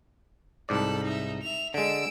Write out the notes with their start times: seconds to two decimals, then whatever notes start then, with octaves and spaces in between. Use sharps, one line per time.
0.69 C2 G#2 A4 D5 B5
1.03 D#4 E5
1.43 E5 F7
1.74 D3 G#3 E6 D7